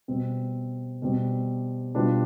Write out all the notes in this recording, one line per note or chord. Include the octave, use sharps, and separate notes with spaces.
B2 G3 C4
B2 G3 C4
B2 G3 D4 F4 B4